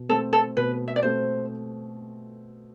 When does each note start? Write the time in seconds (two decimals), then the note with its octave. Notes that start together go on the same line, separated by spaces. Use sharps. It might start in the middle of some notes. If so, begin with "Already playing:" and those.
Already playing: B2
0.09 A3 C4 A4
0.33 A4
0.57 B2 B4
0.88 E5
0.96 D5
1.03 A3 C4 C5